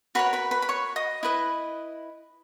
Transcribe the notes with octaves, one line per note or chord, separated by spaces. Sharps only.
F#4 A#4 B4 C#5 B5
B4 B5
B4 B5
B5
C#5 C#6
D#5 D#6
E4 B4 D#5